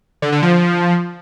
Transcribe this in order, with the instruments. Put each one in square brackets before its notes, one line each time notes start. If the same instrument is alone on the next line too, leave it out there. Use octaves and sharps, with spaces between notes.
[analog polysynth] D3
D3
F3